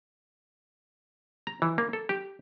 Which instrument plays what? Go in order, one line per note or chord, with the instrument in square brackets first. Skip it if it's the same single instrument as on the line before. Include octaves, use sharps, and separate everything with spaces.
[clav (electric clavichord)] A#5
E3
A#3
A4
G4